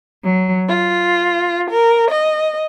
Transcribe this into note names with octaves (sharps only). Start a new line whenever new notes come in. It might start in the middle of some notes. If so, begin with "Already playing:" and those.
F#3
F4
A#4
D#5